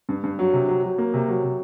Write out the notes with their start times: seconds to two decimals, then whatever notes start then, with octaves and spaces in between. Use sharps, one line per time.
0.09 G2
0.24 G2
0.39 F#3
0.53 C3
0.69 F#3
0.83 F#3
0.98 A#3
1.14 C3
1.28 F#3
1.43 C3